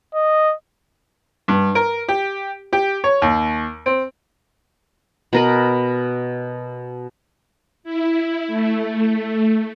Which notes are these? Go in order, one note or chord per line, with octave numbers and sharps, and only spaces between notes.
D#5
G2
A#4
G4
G4
C#5
D#2
C4
B2 A#4 B4
E4
A3